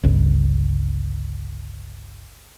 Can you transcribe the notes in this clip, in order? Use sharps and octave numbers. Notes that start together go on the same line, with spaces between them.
G1 C#2